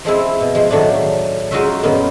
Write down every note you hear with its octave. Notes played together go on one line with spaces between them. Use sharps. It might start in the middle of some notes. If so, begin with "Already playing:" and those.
F3 G#3 C4 E4
B2
F3 G#3
A2 D#3 F#3 A3 D4
G#3 D#4 F4 F#4 D#5 E5
F#2 A#2 D#3 A#3 B3 C#4